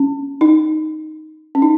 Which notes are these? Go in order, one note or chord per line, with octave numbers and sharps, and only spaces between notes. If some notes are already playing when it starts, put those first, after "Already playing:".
Already playing: C#4
D#4
C#4
D#4